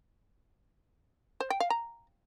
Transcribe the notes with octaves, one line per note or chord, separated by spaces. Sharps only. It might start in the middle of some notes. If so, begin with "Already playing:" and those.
C5
G5
F5
A#5